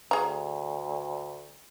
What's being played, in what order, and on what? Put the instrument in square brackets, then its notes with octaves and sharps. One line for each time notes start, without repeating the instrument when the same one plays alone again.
[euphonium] D2 [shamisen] G#4 A#5